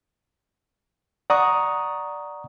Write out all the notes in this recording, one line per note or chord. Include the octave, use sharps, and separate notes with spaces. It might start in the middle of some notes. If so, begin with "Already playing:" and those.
D5 F#5 A#5 C#6 D#6